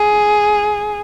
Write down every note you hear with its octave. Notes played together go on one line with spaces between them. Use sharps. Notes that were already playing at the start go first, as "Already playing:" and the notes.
Already playing: G#4